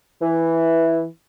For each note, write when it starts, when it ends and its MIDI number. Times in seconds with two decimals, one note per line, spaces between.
0.20 1.03 52